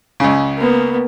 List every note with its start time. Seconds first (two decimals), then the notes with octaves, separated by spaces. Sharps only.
0.20 C#2 C#3
0.57 A#3 B3